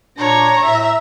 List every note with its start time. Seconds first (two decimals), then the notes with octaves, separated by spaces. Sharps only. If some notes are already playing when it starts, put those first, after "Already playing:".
0.18 A#2 D4 C#5 A#5
0.66 A2 E5